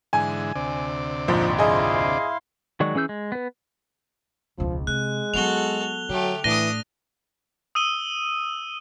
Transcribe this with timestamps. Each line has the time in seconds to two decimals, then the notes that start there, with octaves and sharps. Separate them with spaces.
0.13 G#2 D3 E3 G#5
0.55 D2 C3 D5
1.28 A#1 F2 G#2 F3
1.58 E4 G#4 D#5 F5 C6
2.80 D#3 F#3 G#3 D5 C#6
2.95 E3 C#4 G#4 E6 G6
3.09 G#3
3.32 B3 B4
4.58 E1 C#2 F3
4.87 C3 G#3 F#6
5.34 F#3 B3 F#4 A4 F7 G7
6.09 D3 F#3 A3 G4
6.44 A2 E3 D4 D#6 A#6 D#7 G7
7.75 D#6 E6 D#7 G7